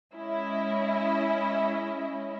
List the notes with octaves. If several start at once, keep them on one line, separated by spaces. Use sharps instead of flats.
G#3 C#4 E4 D#5